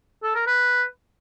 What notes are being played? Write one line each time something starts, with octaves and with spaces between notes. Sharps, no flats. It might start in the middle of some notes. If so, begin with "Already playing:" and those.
A4
A#4
B4